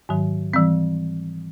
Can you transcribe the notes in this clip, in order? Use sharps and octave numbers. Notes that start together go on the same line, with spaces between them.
G#2 D#3 F#3
E3 G3 C4